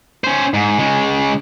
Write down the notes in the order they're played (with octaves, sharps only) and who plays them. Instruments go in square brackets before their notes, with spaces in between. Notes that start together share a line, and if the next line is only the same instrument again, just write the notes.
[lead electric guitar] C#4 C5
G#2
C#3 G#3